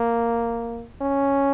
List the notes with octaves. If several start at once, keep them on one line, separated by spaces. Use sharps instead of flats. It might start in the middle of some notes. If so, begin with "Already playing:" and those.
Already playing: A#3
C#4